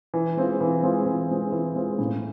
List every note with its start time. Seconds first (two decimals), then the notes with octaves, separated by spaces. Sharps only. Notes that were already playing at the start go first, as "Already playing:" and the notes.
0.14 E3
0.37 G#3 C4 F4
0.61 E3
0.83 G#3 C4 F4
1.06 E3
1.29 G#3 C4 F4
1.52 E3
1.76 G#3 C4 F4
1.99 A2